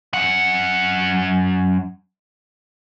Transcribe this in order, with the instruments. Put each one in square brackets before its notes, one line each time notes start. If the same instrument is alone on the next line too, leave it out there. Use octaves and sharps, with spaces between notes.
[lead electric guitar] F#2 F#5